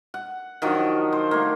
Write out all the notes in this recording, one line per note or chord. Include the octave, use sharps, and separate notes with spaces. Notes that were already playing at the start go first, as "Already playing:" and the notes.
F#5
D#3 F3 F#3 D4
C5
A3 A#3